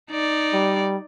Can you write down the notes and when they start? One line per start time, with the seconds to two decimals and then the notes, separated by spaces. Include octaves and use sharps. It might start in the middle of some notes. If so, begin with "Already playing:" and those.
0.11 D#4 D5
0.53 G3